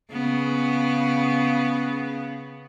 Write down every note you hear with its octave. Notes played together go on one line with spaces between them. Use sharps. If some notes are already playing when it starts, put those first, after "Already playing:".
C#3 B3